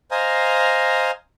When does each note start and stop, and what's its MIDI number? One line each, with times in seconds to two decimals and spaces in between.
0.11 1.11 72
0.11 1.11 75
0.11 1.11 77
0.11 1.11 80
0.11 1.11 82